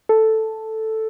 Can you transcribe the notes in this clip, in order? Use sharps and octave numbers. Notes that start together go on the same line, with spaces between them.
A4